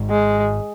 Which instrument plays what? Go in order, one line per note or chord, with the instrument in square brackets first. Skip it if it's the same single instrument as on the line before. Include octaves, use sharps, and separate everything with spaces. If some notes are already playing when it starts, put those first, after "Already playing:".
Already playing: [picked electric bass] G#1 G#2
[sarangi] G#3